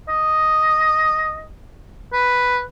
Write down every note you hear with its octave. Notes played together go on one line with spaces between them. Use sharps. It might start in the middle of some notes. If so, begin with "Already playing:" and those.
D#5
B4